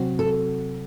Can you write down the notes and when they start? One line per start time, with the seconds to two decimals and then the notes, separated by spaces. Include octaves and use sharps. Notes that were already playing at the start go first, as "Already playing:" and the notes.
Already playing: C3 F#3 C4 F#4
0.19 A4